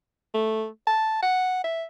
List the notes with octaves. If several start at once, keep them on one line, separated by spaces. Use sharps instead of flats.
A3
A5
F#5
E5